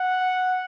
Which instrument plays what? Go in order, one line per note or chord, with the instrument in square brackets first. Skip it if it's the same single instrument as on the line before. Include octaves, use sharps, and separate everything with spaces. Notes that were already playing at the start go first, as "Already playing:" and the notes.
Already playing: [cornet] F#5